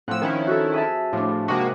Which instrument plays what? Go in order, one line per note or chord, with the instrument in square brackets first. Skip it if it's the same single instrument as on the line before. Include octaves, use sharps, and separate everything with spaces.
[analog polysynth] A2 E6 [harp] F3 C4 F#5
[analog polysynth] D#3 C#4 E4
[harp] F#4 A4
G#4 E5 A5
[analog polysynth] A2 [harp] F3 D4
[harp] G#2 C3 D#4 [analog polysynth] A#3 F#4